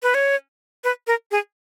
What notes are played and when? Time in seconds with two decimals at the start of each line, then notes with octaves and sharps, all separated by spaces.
0.03 B4
0.14 C#5
0.84 B4
1.07 A#4
1.31 G#4